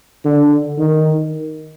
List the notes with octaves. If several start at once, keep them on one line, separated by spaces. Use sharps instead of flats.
D3
D#3